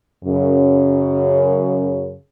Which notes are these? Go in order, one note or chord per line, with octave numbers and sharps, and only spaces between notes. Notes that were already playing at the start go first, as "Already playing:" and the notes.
F#2 C#3